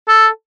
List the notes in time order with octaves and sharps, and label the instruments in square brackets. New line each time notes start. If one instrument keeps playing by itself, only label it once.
[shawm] A4